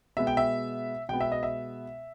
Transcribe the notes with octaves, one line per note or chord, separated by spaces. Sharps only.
B2 G#3 B3 E5
G5
E5
B2 G#3 B3 G5
E5
D#5
E5